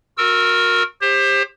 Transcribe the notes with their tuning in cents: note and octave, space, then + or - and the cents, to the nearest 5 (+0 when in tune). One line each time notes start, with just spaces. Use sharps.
F#4 -30 A#4 +0 E6 +0
G4 +25 C5 +25